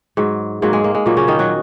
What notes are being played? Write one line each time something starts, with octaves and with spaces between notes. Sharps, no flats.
G#2 F#3
G#2 F#3 A#3
G#3
A#3
G#3
A#2 F#3 A#3
C#3 C#4
D#3 D#4
F#3 F#4